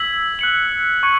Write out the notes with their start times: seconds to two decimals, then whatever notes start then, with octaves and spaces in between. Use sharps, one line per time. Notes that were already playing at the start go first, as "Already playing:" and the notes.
Already playing: E6 G#6 B6 F#7
0.39 F#6 C#7 F#7
1.03 C#6 G#6 C#7